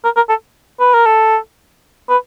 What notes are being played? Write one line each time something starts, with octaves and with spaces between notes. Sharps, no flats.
A#4
A#4
A4
B4
A#4
A4
B4